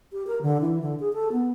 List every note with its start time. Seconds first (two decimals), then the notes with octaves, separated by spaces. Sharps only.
0.13 G4
0.27 A#4
0.42 D3
0.61 E3
0.82 D3
1.00 G#4
1.13 A4
1.32 B3